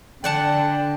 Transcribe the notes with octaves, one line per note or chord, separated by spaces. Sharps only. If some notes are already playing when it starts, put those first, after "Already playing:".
D3 D5 F#5 G5 A5